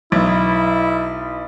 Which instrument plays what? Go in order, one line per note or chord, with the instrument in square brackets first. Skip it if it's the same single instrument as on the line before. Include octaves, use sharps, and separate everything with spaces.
[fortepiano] B1 [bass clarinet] E4